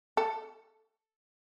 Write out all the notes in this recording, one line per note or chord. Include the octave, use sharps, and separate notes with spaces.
A4